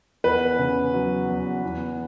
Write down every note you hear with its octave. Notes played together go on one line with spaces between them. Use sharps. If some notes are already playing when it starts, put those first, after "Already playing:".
E2 B4
C#3
F#3
E2
E2